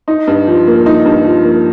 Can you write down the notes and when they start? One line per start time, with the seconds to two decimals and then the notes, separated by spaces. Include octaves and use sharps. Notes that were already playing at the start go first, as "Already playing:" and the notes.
0.08 D#4
0.27 G2
0.47 F3
0.67 A#3
0.86 D#4
1.05 G2
1.25 F3
1.44 A#3